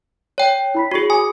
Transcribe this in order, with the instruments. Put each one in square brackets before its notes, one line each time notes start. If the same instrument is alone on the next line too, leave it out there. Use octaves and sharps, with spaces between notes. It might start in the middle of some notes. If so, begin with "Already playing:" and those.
[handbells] C#5 G5
[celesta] E4 B5 B6
[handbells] F#4 G#4 [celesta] C#5 C#6
[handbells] G#5 [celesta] D6 D#6